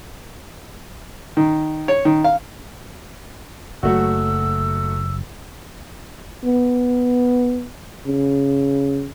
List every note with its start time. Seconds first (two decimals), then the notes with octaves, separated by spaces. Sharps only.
1.37 D#3
1.88 C#5
2.05 D#3
2.24 F5
3.83 F#1 F#2 F#3 A3 F#4 E6
6.44 B3
8.06 C#3